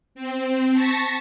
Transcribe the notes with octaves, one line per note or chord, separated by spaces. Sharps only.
C4
A5 C#6 A#6 B6